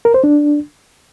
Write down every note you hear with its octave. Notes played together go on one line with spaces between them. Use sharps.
A#4
C5
D4